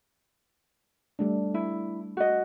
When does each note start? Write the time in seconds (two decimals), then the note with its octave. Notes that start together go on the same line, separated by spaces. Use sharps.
1.19 G3 A3 D4
1.54 E4
2.17 F#4 D#5